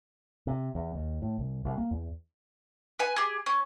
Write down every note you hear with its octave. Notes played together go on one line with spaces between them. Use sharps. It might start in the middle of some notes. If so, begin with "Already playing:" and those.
C3
E2
D#2
A2
C2
C2
A#3
E2
B4 G#5
G4 G#4
C#4